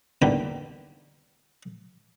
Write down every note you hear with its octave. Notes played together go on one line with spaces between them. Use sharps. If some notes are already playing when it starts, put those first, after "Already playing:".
E2 G2 A#2 D3 D#3 B5